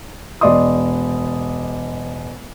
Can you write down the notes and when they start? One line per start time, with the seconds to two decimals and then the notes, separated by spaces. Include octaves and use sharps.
0.41 E1 D5 D#5 C6 D#6